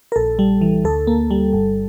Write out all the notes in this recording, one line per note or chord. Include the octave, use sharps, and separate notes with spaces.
A#4
A#1 A4
G3
E3
D2 A4
A#3
G3
G1